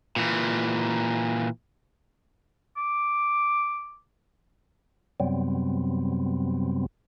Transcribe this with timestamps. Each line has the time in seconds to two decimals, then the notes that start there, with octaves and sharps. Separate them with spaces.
0.16 A#2 E3
2.77 D6
5.20 F#2 C3 F#3 G3 B3 C4